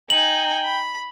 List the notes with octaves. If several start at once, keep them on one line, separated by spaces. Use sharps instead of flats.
D#4 G5 G#5 F#7
B5